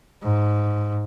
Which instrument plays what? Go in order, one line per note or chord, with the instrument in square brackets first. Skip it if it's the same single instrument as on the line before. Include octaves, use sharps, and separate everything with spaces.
[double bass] G#2